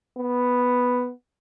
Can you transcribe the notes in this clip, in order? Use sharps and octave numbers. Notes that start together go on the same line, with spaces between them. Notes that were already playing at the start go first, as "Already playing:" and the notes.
B3